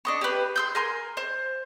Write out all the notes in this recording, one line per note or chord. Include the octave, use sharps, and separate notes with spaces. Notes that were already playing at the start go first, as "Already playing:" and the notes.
D4 D#5 C#6
G4 B4
C6 E6 G6
A#4 G#5 C6
C5